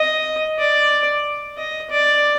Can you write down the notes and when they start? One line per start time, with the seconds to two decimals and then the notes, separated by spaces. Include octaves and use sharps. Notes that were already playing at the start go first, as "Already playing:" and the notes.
Already playing: D#5
0.59 D5
1.58 D#5
1.91 D5